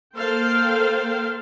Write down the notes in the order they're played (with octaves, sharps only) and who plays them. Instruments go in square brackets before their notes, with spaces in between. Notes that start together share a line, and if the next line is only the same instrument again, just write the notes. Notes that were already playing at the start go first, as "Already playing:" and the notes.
[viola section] A#3 A4 C5 F5 G5